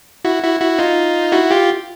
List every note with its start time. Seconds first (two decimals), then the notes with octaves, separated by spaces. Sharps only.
0.25 E4 F#4
0.43 E4 F#4
0.60 E4 F#4
0.79 D#4 F4
1.32 E4 F#4
1.51 F4 G4